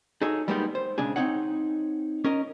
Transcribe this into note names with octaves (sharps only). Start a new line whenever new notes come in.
D#4 F#4 G#4 A4 C#5
G3 G#3 A#3 B3 C#4 D#4
C5
B1 C#3 G#3 D4 G#4
C4 D#4 C#5 F#5
C#4 A#4 D#5